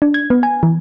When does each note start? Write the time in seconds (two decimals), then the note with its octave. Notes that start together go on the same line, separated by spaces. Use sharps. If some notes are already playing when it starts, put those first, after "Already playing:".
0.02 D4
0.14 G#6
0.30 B3
0.43 G#5
0.63 E3